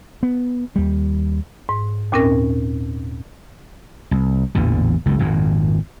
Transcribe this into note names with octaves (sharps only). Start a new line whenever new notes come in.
B3
D#2 G3
G#2
D#2 A#2 C4 C#4 A#4
C2
A1 E2 A#2 D3
F#1 C#2 A2
G#1 F2 A#2